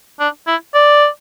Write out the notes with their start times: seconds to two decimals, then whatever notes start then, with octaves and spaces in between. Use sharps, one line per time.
0.20 D4
0.47 E4
0.74 D5